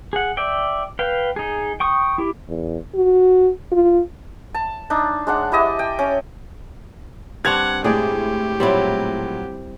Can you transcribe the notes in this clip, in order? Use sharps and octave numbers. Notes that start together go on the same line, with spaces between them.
G#4 F#5
D5 E5 G5
B4 F5 G5
D#4 G#4
G5 C#6 D#6
E4 G4
E2
F#4
F4
A5
D4 D#4
G#3 D4 F#5
E4 G4 D#5 A5
G5
C#4
G2 C4 D4 F#5 G#6 F7
A2 G#3 G4 G#4 D5 G5
A#2 F#3 G3 C4 E4